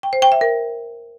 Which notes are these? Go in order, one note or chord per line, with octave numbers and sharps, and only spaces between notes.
G5
C5
G5
E5
A#4